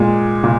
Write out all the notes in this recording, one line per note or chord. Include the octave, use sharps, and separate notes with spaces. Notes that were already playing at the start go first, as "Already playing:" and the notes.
Already playing: A#2 G#3
A#2